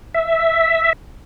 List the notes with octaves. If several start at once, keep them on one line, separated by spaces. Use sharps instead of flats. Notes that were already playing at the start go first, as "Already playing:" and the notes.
E5